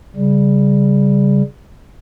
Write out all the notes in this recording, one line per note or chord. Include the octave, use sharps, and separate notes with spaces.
C#3 G3